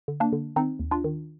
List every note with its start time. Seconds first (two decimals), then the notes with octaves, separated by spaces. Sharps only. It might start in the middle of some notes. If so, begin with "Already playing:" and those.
0.08 D3
0.20 A#3 D4
0.33 D3
0.56 D#3 C4 D#4
0.79 D#2
0.91 D4 F4
1.04 D#3